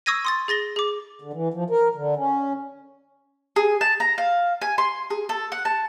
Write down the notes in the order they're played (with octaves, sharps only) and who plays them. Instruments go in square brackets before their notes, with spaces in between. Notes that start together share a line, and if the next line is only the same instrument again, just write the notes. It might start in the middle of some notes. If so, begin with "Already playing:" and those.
[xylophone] C#6 D#6 E6 G#6 A#6 D#7
C6 D#6 A6
G#4 A6 A#6 G7
G#4 D6
[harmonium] D3
E3
F3
A#4
D3
C#4
[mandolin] G#4
A5
A#5
F5
G#5
C6
G#4
A4
F#5
A5